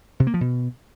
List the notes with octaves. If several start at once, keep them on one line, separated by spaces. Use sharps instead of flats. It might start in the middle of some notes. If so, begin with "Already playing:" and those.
C3
A#3
F3
B2